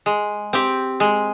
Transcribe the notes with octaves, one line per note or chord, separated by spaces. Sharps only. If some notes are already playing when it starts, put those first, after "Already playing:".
G#3
C4 G4
G#3